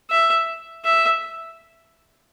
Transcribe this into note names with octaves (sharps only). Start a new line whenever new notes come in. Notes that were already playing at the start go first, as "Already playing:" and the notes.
E5
E5